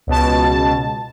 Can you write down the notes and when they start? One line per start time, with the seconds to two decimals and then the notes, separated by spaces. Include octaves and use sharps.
0.07 C#2 B2 A5